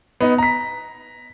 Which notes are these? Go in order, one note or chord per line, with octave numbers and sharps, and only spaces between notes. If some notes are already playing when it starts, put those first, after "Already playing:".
B3 D#4
A#5 B6